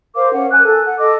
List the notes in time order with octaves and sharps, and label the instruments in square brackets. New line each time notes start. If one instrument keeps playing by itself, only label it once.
[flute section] A#4 C5 F5 D6
C#4 F#5
A#4 G#5 F#6
A4
F#5
A4 D#5 D6